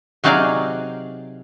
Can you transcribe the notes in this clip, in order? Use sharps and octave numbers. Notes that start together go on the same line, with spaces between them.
C3 F#3 D#4 G#4 D5 F5